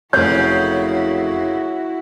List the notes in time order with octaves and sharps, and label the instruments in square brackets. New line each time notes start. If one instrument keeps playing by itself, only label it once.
[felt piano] F1 C#5 [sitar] F#2 A2 C#3 [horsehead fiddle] E4 F#4 [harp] G6